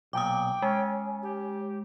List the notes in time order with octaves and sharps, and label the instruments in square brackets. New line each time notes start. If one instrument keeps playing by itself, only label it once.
[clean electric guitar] B1 A#2 [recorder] G5 [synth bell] D6 D#6
[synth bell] G#3 [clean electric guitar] C#4
[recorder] G4